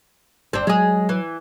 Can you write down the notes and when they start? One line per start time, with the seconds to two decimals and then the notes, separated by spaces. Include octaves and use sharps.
0.53 G1 C4 D4
0.67 F#3 G#3 G#4
1.09 E3